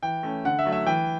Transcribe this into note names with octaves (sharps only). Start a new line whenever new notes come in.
E3 G5
A3 C#4
D3 F#5
E5
F#3 A3
E5
E3 G5